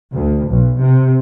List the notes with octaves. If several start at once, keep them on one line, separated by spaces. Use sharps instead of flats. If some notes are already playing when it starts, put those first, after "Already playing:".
D2
B1
C3